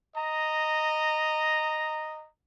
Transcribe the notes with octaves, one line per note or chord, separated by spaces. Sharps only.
D#5 A#5